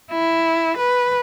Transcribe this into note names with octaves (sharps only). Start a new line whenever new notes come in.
E4
B4